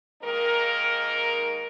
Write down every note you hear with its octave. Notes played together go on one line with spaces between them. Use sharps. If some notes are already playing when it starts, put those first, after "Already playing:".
G#2 D#3 A#3 D#4 A#4